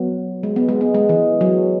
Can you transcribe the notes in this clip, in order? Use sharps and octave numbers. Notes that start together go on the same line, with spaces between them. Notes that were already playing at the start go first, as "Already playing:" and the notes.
Already playing: F#3 B3
G#3
B3
G#3
B3
G#3
E3
F#3